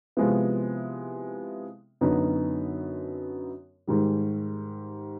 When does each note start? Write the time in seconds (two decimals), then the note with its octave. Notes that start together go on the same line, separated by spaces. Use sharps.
0.17 C3 F3 G#3 B3 E4
2.01 F#2 D3 F#3 B3 D#4
3.87 G#2 D#3 G3